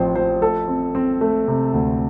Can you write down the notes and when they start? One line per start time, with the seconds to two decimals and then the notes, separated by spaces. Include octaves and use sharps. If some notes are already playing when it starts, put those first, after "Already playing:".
Already playing: A1 A2 F3 C4 C5 G5
0.16 F3 C5
0.42 A3 A4
0.68 C4
0.95 C4
1.21 A3
1.48 C3
1.74 D2